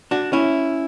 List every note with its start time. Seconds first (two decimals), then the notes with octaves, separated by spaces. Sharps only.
0.11 D4 F#4
0.33 C#4 E4